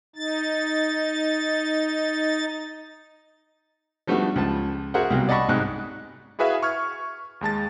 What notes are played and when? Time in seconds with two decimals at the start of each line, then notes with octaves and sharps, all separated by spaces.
0.16 D#4 A6
4.07 F3 G3 A3 B3 D4 F#4
4.36 C#2 F3 A5
4.94 F#4 G#4 A#4 C5 E5 F#5
5.11 C2 B2 F#3
5.29 D5 D#5 F#5 A5 B5 C#6
5.48 C2 G#2 C3 F#6
6.39 E4 F#4 G#4 B4 E5 F5
6.63 C#6 F6 G#6
7.41 D#2 G#3 A5 A6